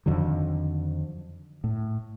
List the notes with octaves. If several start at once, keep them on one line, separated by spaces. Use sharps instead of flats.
F2 D3 D#3 F#3
A2